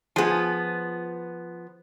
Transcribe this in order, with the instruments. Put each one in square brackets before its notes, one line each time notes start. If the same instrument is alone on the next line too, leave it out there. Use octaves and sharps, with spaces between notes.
[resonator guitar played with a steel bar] F3 B3 [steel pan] F4 G#4 A5